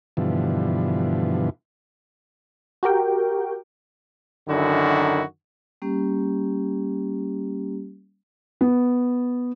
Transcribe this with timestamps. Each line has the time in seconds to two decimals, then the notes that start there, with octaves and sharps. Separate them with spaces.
0.17 G2 B2 D3 E3 F3
2.83 F#4 G4 A#4 G5
4.48 F#2 D3 D#3 E4 F#4
5.82 G3 A#3 C#4 G4
8.61 B3